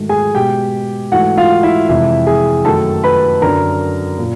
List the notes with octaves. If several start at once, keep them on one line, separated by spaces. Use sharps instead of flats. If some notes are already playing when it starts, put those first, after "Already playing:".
Already playing: G#2 D#3 F#3 A3
G#4 G#5
B2 G#3 G4 G5
G#2 E3 A3 F#4 F#5
F4 F5
E4 E5
F2 C3 E3 G#3 E4 E5
G#4 G#5
F#2 D#3 F#3 A3 A4 A5
B4 B5
F#2 D3 F#3 A#4 A#5
A#2